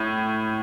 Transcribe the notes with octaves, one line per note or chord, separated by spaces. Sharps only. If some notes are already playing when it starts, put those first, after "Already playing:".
Already playing: A2